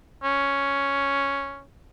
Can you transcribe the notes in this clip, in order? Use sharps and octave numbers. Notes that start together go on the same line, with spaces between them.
C#4